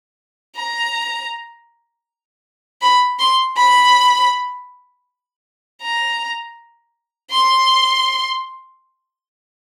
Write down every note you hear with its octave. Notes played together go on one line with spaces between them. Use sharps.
A#5
B5
C6
B5
A#5
C6